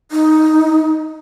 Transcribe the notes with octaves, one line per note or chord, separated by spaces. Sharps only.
D#4